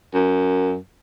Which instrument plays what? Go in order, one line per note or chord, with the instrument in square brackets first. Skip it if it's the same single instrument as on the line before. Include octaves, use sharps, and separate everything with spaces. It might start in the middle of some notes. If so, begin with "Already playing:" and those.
[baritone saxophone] F#2